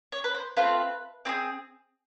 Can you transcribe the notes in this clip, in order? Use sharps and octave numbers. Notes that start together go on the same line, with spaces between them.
C#5
B4
C5
A3 C4 F4 B4
C4 F4 G#4